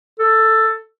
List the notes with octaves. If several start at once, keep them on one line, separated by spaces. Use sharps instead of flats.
A4